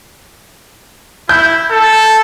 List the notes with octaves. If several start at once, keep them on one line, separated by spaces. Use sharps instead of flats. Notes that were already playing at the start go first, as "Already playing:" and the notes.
E4 G6
A4